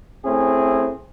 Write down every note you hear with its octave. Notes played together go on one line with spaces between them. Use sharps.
A3 C4 C#4 E4 G#4